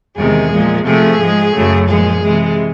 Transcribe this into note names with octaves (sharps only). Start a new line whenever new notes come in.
E2 C3 D#3 G#3 G#4
A#2 F3 G#3
C3 F3 A3 G#4
G#2 F3 G#3
F#2 C#3 F#3 A3
A#2 F3 G#3 G#4
C3 E3 G#3